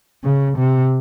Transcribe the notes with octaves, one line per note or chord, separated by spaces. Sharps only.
C#3
C3